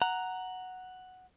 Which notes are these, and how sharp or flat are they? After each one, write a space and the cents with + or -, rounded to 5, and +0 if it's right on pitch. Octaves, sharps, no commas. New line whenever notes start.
F#5 +0 A#5 +0